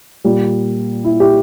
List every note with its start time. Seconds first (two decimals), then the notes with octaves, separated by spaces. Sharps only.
0.24 A#2 G3 A#3
1.04 E4
1.20 E4 G4